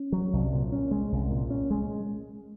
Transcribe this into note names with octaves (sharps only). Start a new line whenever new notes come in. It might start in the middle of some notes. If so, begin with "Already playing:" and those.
Already playing: C#4
F#3
C2
A#2
C#4
G#3
C2
A#2
C#4
G#3